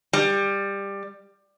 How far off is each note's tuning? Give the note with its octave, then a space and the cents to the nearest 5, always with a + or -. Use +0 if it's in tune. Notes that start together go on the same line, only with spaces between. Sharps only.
G3 +15